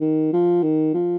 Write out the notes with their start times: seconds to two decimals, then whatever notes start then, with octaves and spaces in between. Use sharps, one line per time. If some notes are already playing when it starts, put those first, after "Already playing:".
0.01 D#3
0.33 F3
0.63 D#3
0.94 F3